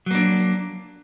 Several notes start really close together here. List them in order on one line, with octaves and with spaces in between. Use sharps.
F#3 A#3 D4